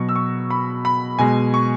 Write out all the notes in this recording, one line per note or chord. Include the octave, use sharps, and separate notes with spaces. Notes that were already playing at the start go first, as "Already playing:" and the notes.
Already playing: B2 F#3 C#6
E6
C#6
B5
B5
B2 G#3 G#5
C#6